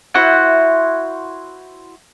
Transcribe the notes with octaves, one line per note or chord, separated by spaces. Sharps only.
E4 F#4 C5 F#5